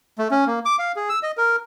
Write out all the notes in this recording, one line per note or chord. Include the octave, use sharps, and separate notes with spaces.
A3
C#4
A#3
D6
F5
G#4
E6
D#5
A#4